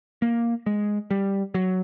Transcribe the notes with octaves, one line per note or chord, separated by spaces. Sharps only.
A#3
G#3
G3
F#3